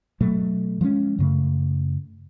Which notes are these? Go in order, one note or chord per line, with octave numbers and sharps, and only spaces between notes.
B2 F#3 A3
F3 G#3 A#3 C#4
F#2 C#3 A3